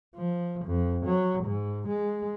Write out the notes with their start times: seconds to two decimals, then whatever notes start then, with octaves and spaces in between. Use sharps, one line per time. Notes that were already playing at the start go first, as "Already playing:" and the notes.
0.16 F3
0.66 F2
1.06 F#3
1.44 G#2
1.88 G#3